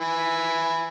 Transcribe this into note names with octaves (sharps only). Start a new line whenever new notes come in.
E3 G#5 B5